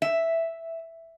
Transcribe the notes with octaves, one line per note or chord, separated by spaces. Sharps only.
E5